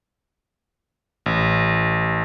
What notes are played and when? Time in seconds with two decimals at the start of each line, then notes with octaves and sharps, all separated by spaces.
1.26 A1